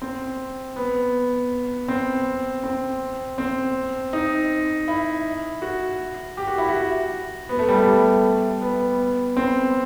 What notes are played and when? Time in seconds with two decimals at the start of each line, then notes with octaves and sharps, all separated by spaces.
0.02 C4
0.76 B3
1.88 C4
2.64 C4
3.38 C4
4.13 D#4
4.88 E4
5.62 F#4
6.37 G4
6.47 F#4
6.58 E4
6.69 F#4
7.49 B3
7.59 A3
7.69 G3
7.77 A3
7.87 G3
8.61 B3
9.37 C4